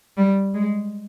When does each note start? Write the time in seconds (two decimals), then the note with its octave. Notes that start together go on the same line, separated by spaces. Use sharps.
0.17 G3
0.54 G#3